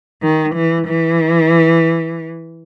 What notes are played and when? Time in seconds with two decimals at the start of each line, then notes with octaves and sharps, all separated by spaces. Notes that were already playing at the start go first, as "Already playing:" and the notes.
0.22 D#3
0.55 E3
0.88 E3